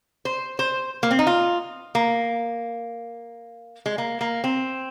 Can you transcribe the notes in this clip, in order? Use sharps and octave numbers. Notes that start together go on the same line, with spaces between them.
C5
C5
A#3
C4
D#4
F4
A#3
G#3
A#3
A#3
C4